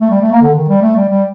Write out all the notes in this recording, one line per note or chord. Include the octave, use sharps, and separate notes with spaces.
A3
G3
A3
A#3
D3
D#3
G3
A3
G3
G3